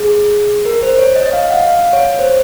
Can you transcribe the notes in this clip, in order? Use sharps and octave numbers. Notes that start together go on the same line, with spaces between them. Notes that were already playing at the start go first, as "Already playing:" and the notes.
Already playing: G#4
A#4
C5
C#5
D#5
D#5
F5
F#5
F5
C#5
C5